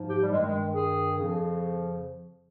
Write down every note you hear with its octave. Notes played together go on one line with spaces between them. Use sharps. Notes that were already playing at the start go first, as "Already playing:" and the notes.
Already playing: G#2 F3
G4
G3
G2 D#3 G#3
G#3
G#4
F2 C#3 F3